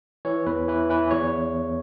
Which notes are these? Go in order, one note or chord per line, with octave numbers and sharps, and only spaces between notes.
E3 C#5
E2 B4
E3 B4
E3 B4
E2 C#5